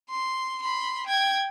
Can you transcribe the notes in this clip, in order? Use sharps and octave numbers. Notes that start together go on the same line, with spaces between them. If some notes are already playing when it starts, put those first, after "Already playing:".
C6
B5 C6
G5 G#6